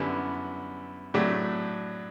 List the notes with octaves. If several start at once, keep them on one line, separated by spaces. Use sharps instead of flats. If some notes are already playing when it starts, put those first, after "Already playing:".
Already playing: F#2 D3 G3 B3 E4
A2 F#3 A3 D4 G4